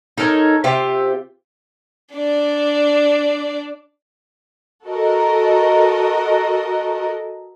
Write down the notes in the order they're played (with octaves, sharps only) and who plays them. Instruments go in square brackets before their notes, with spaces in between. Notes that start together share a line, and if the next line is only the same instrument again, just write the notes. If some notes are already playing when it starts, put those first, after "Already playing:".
[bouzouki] D#4 A4 A#4 C#5
C3 F4 G4 E5
[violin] D4 D5
[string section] F#4 A4 A#4 D#5